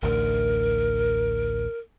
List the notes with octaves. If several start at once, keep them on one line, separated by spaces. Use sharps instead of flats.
A1 D2 A#4